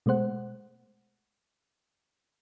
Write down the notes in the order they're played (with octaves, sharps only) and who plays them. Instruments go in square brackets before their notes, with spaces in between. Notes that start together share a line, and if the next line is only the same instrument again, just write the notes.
[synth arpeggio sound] B2 G#3 A3 C5 F#5